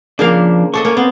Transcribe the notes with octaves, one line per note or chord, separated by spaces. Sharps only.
C#3 F3 A#3 D4 F5
D4 A4 D#5 C#6
A#3 C#4
B3 C4